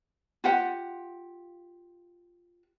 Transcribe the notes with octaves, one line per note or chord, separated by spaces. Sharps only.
F4 G4 F#5